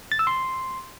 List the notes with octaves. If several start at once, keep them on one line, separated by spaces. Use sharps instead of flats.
A6
E6
C6